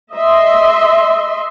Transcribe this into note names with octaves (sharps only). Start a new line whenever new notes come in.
D#5 E5 C6